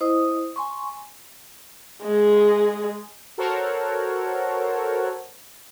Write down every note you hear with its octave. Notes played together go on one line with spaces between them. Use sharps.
E4 C5 D#5 D#6
G#5 C6 C#6
G#3 G#4
F#4 A4 A#4 C5 C#5 F#5